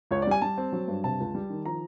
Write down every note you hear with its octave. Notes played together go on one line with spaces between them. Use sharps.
C#2 C#5
D5
G3 G#5
G3 A5
C4
F#3
G2
C3 A5
C#2
G3
D#3
F3 A#5